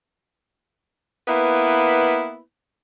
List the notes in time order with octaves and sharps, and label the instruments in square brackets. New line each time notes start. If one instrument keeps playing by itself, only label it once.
[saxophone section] A#3 B3 E4 B4